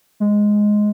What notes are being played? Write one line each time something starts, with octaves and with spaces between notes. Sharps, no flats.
G#3